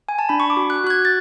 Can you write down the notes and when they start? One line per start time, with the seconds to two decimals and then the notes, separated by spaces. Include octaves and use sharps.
0.09 G#5
0.19 A5
0.29 D4 B5
0.40 C#6
0.50 D6
0.57 F#4
0.70 F#6
0.84 F#4 F#6
0.90 G#6
1.05 A6